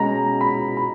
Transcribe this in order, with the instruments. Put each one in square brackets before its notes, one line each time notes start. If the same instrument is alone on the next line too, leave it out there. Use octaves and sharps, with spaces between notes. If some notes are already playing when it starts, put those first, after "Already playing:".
Already playing: [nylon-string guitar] B2 G#3 C#4 [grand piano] A#5
[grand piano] B5
B5